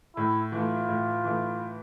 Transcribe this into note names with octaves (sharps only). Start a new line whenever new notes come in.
A2 E4
E3 A3 F4
A2
E3 A3